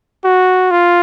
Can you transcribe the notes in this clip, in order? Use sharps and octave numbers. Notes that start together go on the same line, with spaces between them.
F#4
F4